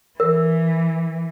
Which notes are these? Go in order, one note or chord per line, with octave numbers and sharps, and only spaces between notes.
E3 A#4